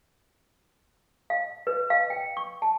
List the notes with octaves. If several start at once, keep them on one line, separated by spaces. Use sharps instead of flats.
F5
B4
F5
G5
C#6
A5